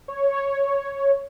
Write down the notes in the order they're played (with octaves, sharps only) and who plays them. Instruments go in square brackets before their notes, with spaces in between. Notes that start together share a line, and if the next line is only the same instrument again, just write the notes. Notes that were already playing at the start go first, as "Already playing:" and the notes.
[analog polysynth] C#5